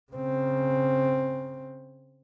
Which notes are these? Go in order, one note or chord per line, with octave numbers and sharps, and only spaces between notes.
C#3 C4